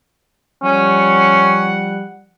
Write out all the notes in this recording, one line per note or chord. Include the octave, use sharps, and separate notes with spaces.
F3 G3 C#4 F#5